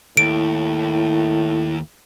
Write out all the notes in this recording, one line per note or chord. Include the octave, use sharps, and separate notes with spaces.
D#2 A2 E4 D7